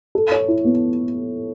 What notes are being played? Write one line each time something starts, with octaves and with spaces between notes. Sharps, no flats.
A4
C#5
E4
B3